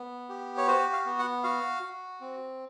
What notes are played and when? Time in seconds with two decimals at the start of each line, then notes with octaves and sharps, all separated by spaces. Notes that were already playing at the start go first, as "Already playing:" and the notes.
Already playing: B3
0.29 G4
0.57 C#5
0.68 F#4 C5
0.93 F5
1.06 B3
1.19 F#5
1.43 F#4 F5
1.83 F#4
2.21 C4